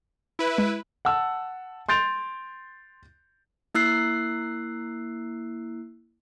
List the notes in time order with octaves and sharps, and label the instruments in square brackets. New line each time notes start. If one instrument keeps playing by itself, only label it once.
[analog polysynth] E4 B4
[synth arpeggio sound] G#3
[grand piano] F#5 A5 E6
C6 G6 A6 D7 F7
[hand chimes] A#3 E4 E6 F#6 C7